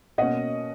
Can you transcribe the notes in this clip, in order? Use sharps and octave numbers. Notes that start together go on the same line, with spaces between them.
B2 A#3 C#4 D#5 F#5